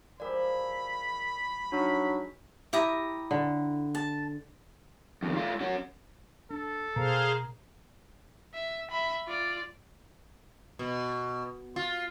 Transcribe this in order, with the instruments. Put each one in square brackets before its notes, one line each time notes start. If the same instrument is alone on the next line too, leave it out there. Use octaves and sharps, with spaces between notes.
[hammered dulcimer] F3 G#3 G4 [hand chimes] A#4 D5 [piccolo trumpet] B5
[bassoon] F#3 [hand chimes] D4 D#4
[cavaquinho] E4 A#5 D#6 [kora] G4
[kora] D3
[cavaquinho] A5
[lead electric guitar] F2 D#3
A3 F4
C#4 F#4
[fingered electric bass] D4 [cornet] A4
[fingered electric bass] B2 [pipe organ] G#4 C5 F5 [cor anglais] A#4
[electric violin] E5
E5 B5
F4 D5
[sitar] B2
F4